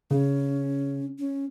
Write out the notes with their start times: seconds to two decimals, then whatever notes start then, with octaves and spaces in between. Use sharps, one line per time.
0.11 C#3 C#4
1.19 C#4